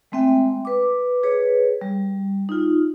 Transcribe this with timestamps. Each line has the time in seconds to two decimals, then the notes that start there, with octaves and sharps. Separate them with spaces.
0.12 G#3 A3 C4 E5 G5
0.65 B4 D6
1.23 G#4 B4 C#5
1.81 G3
2.49 D#4 F4